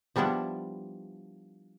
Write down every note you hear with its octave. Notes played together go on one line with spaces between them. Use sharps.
F3 G3 B3 D4 E4 G4